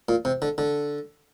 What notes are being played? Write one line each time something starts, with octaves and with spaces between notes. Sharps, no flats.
A#2
C3
D3
D3